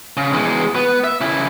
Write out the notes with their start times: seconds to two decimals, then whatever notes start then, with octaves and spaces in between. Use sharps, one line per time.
0.17 C#3
0.33 E2 G#3
0.75 B3
1.04 E5
1.21 C#3 E4